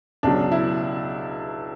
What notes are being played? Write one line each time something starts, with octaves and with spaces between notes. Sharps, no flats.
C#2 B2 F#3 D4
E4